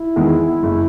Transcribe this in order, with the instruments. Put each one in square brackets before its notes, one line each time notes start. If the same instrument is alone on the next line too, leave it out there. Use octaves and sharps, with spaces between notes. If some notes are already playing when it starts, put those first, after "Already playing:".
Already playing: [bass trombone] E4
[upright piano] E2 D#3 G#3
F#1